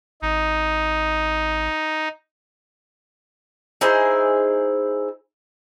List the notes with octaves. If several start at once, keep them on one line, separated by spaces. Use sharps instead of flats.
G#1 D#4
D#4 E4 G#4 C5